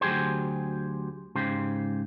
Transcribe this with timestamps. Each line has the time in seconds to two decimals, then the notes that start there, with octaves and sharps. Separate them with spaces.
0.01 D2 F#3 G4 G#4 C5
1.35 G#2 C#3 G4 C5